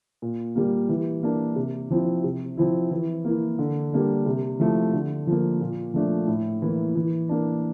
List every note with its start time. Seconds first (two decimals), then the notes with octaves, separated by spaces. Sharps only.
0.22 A#2
0.56 G3 A#3
0.89 E3
1.23 A#3 D4
1.56 C3
1.90 F3 C4 E4
2.24 C3
2.57 F3 C4 E4
2.91 E3
3.25 A#3 E4
3.59 D3
3.93 G3 A#3 D4
4.26 C3
4.60 F3 A3 E4
4.94 D3
5.27 F3 A#3
5.61 A#2
5.94 F3 A3 D4
6.28 A2
6.62 E3 A#3 E4
6.95 E3
7.29 A#3 D4